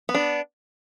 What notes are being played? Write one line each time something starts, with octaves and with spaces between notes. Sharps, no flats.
B3
D4